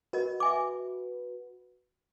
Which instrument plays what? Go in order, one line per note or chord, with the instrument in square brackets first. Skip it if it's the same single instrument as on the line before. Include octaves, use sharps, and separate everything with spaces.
[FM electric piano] F#4 B4 [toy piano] A#4 D#5
[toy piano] E5 G#5 D6